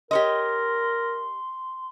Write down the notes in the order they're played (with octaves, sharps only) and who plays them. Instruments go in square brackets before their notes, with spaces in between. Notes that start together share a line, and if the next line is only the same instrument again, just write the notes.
[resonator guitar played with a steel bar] G4 C#5 D#5 [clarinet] A#4 [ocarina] C6